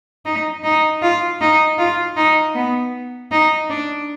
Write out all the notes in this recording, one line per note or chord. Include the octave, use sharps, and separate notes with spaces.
D#4
D#4
F4
D#4
F4
D#4
B3
D#4
D4